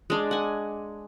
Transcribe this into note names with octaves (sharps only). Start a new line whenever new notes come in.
G#3 D4
F#5 G#5